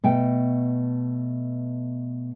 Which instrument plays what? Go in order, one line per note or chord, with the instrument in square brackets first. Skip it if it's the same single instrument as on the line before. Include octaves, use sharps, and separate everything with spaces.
[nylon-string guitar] B2 A3 G5